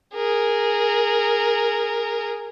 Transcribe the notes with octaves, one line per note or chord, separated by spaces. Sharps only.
G#4 A#4